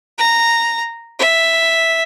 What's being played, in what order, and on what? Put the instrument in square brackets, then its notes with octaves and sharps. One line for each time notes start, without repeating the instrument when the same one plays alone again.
[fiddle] A#5
E5